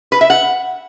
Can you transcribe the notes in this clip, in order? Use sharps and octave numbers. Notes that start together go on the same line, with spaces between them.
B4
E5
F#5